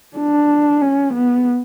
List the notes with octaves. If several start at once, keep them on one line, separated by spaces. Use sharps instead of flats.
D4
C#4
B3